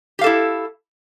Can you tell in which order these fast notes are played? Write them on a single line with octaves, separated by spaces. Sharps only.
G4 F5 A4 E4